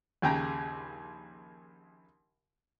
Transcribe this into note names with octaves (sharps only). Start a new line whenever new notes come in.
A#1 D#2 C#3 G5 A#5